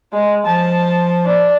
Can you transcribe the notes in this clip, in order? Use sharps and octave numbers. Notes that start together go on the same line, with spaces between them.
G#3
F3 A5
D4